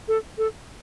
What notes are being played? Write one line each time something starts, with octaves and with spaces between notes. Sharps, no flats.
A4
A4